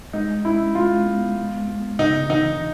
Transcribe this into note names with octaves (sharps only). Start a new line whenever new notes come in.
G#3 D#4
C#4 E4
G#3 F4
B3
G#3
B3
C#3 D#4
E3 D#4